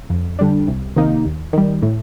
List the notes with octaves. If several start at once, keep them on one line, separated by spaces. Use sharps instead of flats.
F2
D3 G3 D4
C2
C3 D#3 A#3 D#4
D#2
D#3 G3
A2